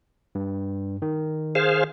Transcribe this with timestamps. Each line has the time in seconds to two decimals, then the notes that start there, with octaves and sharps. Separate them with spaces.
0.35 G2
1.02 D#3
1.55 G#4 C5 F5